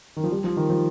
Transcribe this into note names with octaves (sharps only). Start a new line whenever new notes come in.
D#3
F3
G3
F3
D#3
F3